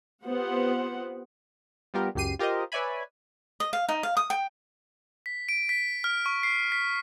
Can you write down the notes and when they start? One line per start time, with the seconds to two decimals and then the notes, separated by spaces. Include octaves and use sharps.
0.25 B3 C4 F4 G4 C5 F#5
1.94 G3 B3 F4 G4 A#4
2.15 C#2 F#2 G4 C7 D#7
2.39 F4 G4 A#4 C5 D#5
2.72 B4 C#5 D5 E5 G#5 B5
3.60 D#5
3.73 F5
3.89 D#4
4.03 F5
4.17 D#6
4.30 G5
5.26 B6
5.49 D7
5.69 B6
6.04 F6
6.26 C#6
6.43 C7
6.72 B6